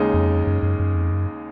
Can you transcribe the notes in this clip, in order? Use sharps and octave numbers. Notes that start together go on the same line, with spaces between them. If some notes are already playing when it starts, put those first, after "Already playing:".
Already playing: D#2 C#3 G#3 D#4
F2
F#2
F#2
F#2
F2
F#2